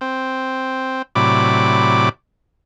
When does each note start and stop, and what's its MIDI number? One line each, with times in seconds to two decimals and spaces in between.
0.01 1.02 60
1.15 2.09 45
1.15 2.09 48
1.15 2.09 54
1.15 2.09 74
1.15 2.09 83
1.15 2.09 86